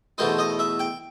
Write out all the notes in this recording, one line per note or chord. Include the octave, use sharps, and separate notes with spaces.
E2 B2 A3 D#4 C5
D#5
E5
G5